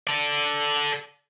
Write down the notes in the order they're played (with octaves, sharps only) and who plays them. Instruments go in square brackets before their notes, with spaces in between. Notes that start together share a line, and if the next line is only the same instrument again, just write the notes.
[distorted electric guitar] A4 D5